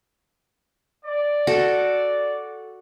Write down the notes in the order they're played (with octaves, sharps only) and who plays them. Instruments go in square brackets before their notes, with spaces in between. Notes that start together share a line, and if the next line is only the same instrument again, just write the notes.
[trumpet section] D5
[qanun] F#4 A4